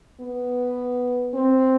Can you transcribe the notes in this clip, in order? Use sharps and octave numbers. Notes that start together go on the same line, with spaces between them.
B3
C4